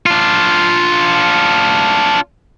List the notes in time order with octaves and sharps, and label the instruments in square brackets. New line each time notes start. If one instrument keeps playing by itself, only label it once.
[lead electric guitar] D4 F4